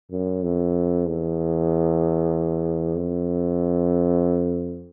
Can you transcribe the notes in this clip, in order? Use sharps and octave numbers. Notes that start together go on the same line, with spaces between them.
F#2
F2
E2
F2